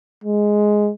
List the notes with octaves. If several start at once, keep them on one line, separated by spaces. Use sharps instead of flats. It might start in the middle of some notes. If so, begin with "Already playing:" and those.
G#3